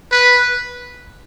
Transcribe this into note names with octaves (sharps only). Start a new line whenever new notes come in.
B4